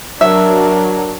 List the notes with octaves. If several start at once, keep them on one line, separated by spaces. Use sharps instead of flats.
F#3 D4 A#4 E5